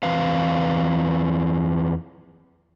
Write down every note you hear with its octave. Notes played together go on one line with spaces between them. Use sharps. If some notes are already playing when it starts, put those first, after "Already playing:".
E2 E3 C4 B4 F5